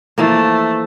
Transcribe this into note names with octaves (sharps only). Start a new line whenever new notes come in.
E3 F3 A3 A#3